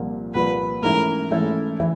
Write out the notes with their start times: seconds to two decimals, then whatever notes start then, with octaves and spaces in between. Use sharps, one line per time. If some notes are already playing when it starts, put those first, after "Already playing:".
Already playing: C2 A#2 F3 A#3
0.34 C2 A#2 F3 A#3 B4
0.83 G#2 E3 A3 C#4 E4 A#4
1.31 G#2 E3 A3 C#4 E4 A4
1.80 E3 E4